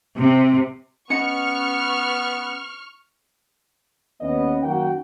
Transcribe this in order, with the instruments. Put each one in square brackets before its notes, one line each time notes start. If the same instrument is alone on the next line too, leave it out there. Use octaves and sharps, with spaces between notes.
[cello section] C3
[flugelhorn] B3 [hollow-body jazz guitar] C#4 D#5 F#5 [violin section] C#6 F6 [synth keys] C#7
[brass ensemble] D#2 B3 C#4 D#5
F#2 D#3 A#3 F#4 F#5 G5